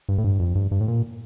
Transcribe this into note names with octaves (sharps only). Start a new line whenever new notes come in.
G2
A2
G2
F2
G2
G2
A2
A#2